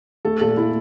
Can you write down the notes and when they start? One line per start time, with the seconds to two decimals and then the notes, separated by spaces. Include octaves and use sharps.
0.25 A3 A4
0.41 A#2 A4
0.57 A3 E4